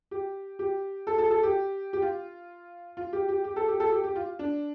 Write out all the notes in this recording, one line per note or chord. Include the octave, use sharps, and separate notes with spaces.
G4
G4
A4
A4
A4
G4
G4
F4
F4
G4
G4
G4
A4
G4
A4
G4
G4
F4
D4